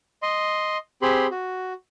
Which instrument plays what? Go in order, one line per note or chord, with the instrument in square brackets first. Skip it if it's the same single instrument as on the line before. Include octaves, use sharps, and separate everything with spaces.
[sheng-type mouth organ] D#5 C6
C4 G4 G#4 B5 C6
F#4